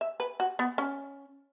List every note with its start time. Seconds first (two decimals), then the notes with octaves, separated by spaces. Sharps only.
0.01 E5
0.20 B4
0.40 F#4
0.59 B3
0.78 C#4